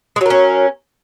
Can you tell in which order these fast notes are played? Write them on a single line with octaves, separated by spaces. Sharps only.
G#3 F#3 A#4 C#4